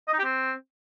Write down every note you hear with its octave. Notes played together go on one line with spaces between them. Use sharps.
D#5
D#4
G4
C4